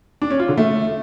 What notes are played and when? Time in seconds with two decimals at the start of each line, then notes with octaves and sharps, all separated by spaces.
0.22 D4
0.31 C#4
0.40 F4
0.49 D3
0.57 A3